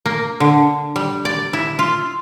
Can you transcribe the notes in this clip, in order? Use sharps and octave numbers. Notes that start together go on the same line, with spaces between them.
A#3
D3
G3
D5
E4
F4